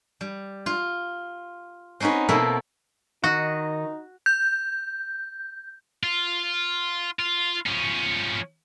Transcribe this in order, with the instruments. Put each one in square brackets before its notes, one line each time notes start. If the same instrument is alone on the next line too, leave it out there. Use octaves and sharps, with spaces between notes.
[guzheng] G3
F4
C4 C#4 D#4 F#4 B4
B2 A#3 C4 E4 A4 B5
[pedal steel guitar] D#3 D#5 [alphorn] D#4 [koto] F#4
[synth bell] G6
[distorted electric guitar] F4
F4
F3 C#4